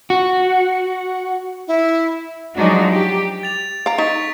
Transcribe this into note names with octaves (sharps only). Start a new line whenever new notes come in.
F#4
E4
F3 F#3 G#3 D4 D#4 F#4
G4
A6 F7
F5 A#5 D7
D#4 C#6 A6 B6